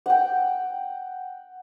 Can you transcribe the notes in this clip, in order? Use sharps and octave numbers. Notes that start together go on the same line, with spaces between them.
F#5 G5